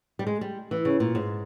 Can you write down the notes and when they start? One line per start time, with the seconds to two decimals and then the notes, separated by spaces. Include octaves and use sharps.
0.19 G3
0.27 G#3
0.41 G3
0.71 E3
0.85 C#3
1.00 A#2
1.15 G#2